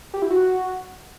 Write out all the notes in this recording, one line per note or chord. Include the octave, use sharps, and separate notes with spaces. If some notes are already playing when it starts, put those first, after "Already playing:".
G4
E4
F#4